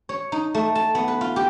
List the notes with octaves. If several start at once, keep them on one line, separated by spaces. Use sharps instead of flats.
C#5
D#4
A3
A5
B3
B4
F4
G4